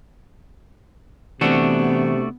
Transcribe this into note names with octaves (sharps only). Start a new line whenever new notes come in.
C3 E3 A3 B3 C4 D4 F#4